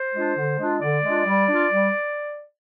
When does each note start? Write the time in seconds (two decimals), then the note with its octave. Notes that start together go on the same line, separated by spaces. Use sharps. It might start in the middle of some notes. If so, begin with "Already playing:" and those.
Already playing: C5
0.14 G#3 D4 F4
0.37 D3
0.59 G#3 D4 F4
0.81 D3 D5
1.04 G#3 D4 F4
1.26 G3
1.48 D4 F4
1.70 G3